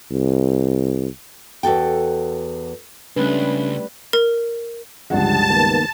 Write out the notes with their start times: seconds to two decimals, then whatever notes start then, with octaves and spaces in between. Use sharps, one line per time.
0.12 C2
1.63 E2 F#4 A4 G5
3.16 C#2 G3 A3 C#4 D4 B4
4.13 A#4
5.10 C#2 G2 D3 F3 G#4 F#5 A5
5.50 D#3 A#3 B3